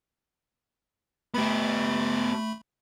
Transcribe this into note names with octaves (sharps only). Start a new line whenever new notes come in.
A3 B3 G4 B5